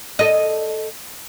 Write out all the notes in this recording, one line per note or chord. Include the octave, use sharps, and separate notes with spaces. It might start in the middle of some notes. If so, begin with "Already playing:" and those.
A4 D#5